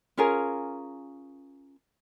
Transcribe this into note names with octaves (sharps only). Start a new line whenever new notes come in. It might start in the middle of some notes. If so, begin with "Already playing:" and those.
C#4 F4 G#4 A#4